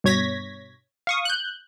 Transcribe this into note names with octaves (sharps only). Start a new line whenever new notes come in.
G2 B2 C#5 G#6 A#6 B6
F5 C#6 D#6
F#6 G6